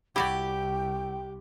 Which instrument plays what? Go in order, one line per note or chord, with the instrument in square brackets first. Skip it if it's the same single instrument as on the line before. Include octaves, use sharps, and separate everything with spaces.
[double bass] C2 [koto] E4 F#4 D5 [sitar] G4 [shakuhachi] G5